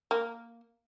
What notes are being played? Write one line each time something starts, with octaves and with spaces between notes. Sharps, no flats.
A#3